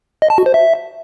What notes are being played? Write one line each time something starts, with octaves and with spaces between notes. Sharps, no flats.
D#5
A5
F#4
C5
E5